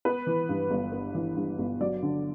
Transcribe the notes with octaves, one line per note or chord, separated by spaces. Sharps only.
B3 B4
E3
G2
G1
B3
E3
G2
G1
F#3 D5
D3